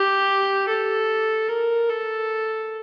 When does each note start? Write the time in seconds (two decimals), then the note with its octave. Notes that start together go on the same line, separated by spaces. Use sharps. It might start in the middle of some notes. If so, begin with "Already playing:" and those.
Already playing: G4
0.68 A4
1.49 A#4
1.89 A4